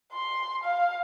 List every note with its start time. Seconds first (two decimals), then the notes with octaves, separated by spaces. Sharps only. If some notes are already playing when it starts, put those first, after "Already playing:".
0.13 C6
0.63 F5